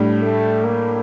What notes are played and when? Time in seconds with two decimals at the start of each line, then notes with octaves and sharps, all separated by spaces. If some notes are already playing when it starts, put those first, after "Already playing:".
Already playing: A2 G3 D4
0.22 A3
0.64 A#3